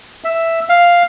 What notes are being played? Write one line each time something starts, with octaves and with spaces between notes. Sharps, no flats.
E5
F5